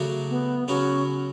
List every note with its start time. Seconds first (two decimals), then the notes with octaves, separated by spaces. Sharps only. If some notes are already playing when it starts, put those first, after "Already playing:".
Already playing: C#3 F#3 A3 D4 F#4
0.30 B3
0.68 C#3 F#3 B3 C#4 F#4